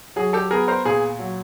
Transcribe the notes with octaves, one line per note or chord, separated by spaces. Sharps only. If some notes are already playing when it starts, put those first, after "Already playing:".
F#3 G#4
G4 A4
B3 G#4 A#4
A#4 C5
A#2 G#4
F#3